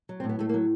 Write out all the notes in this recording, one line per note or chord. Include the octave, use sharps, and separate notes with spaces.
F#3
A2 C4
B3
A2 A3
A#3
F#3